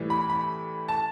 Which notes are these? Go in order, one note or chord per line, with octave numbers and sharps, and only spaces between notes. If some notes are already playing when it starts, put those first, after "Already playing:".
Already playing: A2 E3 G3
B5
B5
A5